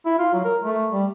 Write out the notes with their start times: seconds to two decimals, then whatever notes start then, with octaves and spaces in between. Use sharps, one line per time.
0.06 E4
0.19 F4
0.34 F#3
0.45 A#4
0.62 A3
0.92 G3